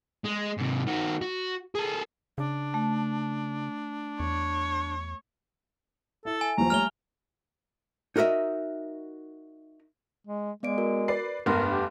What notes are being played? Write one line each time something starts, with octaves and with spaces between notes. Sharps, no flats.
G#3
G#2 C3
D#3 F#4
F#4
G#4 A4
C#3 D4
A3
E2 C#5
E4 A4
G#5
D#2 F3 A#5
G3 A3 C#5 F6 F7 G7
D#4 F#4 A#4 D#5 E5
G#3
G#3 B3 D5 D7
F#4 A#4
B4 D5 C7
F1 G2 B3 A#4 B4 F#5 C6
G4